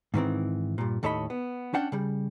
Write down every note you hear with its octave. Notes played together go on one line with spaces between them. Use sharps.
G#2 D#3 E3 C4
G2 A#2
D#2 A2 A4 C#5 D#5 B5
B3
C#4 D4 F#5 G5
C#3 G3